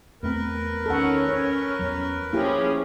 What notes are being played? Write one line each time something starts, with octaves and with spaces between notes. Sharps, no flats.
E2 A3 C4 A#4 B4
D#3 C#4 A4 F#5
C#4 C#5
E2 F#3
F3 A#3 C#4 E4 G4 G#4